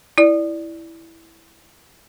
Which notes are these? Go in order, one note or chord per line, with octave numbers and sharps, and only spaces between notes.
E4 D5